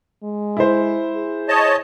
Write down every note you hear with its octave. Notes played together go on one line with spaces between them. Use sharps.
G#3
E4 C5
G#4
C#5 D#5 A5